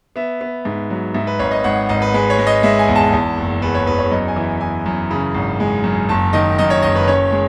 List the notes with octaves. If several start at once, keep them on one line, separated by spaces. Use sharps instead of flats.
B3 E5
B3
G#2
F#3
G#2 E5
B4
G#1 C#5
D#5
G#1 F#5
G#1 D#5
B4
G#3 B4
C#5
G#3
D#5
G#3 E5
G#5
E2
A5
E2
F#1
E2 B4
C#5
E2 B4
C#5
F#2 D#5
G#5
E3
E3 G#5
F#2
C#3
G#1
G#3
F#2
F#1 A5
D#3 D#5
F#2 D#5
C#5
F#1 D#5
B4
C#4 C#5
G#3